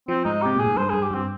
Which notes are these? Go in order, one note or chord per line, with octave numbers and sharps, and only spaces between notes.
F3 C4
G#2 D#4
C3 G4
A#2 G#4
G#2
G2 C5
G2 G#4
G4
G2 C4